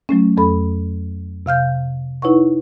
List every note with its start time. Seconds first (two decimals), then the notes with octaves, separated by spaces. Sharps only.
0.09 F#3 A3 C#4
0.37 F2 C#4 A4 B5
1.46 C3 F5 F6 G6
2.22 D#4 E4 B4 C#5 F#5 C#6